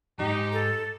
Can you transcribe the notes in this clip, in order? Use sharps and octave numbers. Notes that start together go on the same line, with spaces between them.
E2 G#2 D#4 G4
A4